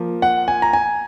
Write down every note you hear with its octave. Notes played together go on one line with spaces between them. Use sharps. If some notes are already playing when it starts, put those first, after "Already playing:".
Already playing: F3 A#3
F#5
G#5
A#5
G#5